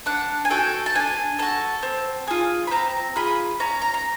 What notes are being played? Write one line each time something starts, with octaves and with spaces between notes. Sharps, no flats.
D4 F#5
G#5
F#4 A4 G5
A5
D4 G#5
F#4 A4 A5
C4
F4 G#4
B5
C4 A#5
F4 G#4 B5
C#4 A#5
A#5
A#5